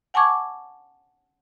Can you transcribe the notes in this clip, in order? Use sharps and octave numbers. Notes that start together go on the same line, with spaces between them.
F#5 G#5 A5 C#6 D6 G#6